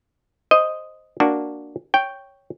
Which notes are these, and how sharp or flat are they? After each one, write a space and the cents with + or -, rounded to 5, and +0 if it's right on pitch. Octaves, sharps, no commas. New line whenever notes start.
C5 +0 D#5 +0
A#3 +0 D4 +0 F#4 +0
C#5 +0 G5 +0